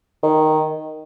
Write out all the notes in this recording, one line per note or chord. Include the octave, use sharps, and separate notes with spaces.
D#3